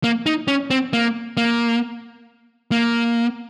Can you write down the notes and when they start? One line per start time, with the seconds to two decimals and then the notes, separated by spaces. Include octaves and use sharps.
0.04 A#3
0.26 D#4
0.48 C#4
0.70 C4
0.93 A#3
1.37 A#3
2.72 A#3